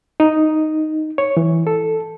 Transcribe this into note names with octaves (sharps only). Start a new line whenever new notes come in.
D#4
C#5
E3
A4